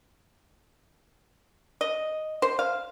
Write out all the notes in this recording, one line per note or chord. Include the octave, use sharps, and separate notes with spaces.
D#5
C5
F5